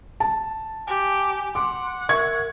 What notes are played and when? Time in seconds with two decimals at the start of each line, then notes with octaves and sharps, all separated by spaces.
0.20 A5
0.87 G4 G#5
1.55 F#5 C6 D6
2.09 A#4 E5 C#6 G#6